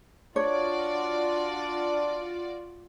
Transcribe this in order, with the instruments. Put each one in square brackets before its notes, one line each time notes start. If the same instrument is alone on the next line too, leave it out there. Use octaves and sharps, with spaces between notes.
[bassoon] D4 [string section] F4 F#4 D5 [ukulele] C#5